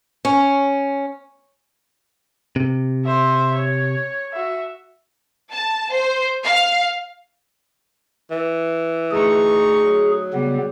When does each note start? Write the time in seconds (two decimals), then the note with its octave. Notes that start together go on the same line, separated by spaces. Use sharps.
0.25 C#4
2.56 C3
3.05 C5 E5
3.55 C#5
4.33 F#4 E5
5.52 A5
5.91 C5
6.44 F5
8.31 E3
9.11 D2 D#4 G#4 C#6
9.85 F#3
10.34 C#3 G3 B3